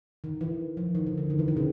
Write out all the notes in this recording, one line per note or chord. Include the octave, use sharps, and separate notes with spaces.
D#3
E3
F3
D#3
D3
D3
D#3
E3
D#3
C#3